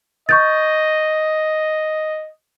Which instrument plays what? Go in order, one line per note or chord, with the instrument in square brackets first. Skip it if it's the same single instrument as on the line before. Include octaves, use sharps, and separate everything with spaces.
[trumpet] D#5 [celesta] C#6 G6 A6